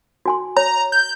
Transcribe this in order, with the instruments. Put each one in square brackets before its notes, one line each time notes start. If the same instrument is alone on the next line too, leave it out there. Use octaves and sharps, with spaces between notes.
[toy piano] F#4 G#5 C6
[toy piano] C#5 [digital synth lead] A#5
[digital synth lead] G6